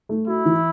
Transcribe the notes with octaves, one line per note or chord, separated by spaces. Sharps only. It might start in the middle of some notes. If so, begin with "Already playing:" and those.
A3
E4 F#4
E3